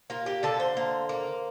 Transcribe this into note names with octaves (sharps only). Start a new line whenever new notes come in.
A#3 F4
G4
D3 A4
C5
A#3
A#3